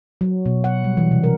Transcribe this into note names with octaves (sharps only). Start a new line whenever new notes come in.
F#3
B2
F#5
G3
E3
C3
A#4